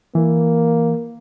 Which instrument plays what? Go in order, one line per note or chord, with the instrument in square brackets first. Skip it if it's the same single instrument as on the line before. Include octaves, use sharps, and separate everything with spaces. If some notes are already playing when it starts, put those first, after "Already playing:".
[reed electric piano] E3 [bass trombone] A#3